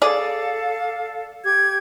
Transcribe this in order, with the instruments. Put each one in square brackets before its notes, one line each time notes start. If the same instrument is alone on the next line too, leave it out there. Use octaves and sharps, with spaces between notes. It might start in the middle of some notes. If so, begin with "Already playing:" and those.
[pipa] G#4 D5 [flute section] A4 F5
[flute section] G4 G#6